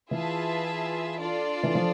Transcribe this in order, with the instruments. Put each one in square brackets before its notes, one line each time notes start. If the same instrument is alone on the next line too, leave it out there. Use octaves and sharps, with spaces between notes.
[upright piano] E3 [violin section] F4 G#4 B4 E5 A5
[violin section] D4 F4 A4 D5
[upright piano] E3
F3